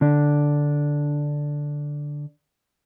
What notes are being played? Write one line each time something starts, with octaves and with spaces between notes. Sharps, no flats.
D3 D4